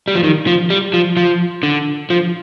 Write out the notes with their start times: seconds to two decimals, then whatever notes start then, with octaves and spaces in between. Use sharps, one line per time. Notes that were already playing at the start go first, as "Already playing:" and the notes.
0.08 G3
0.15 F3
0.23 D#3
0.47 F3
0.70 G3
0.94 F3
1.17 F3
1.63 D3
2.10 F3